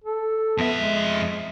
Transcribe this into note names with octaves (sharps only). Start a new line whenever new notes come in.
A4
F2 B3 E5
G#3